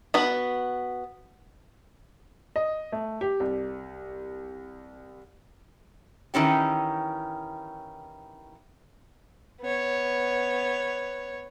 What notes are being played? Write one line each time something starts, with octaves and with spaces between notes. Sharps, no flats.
B3 F#4 B4
D#5
A3
G4
C2
D#3 E3 C#4 G4
B3 C#5